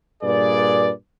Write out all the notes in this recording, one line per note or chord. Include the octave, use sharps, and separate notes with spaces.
G2 A#2 G#4 B4 D5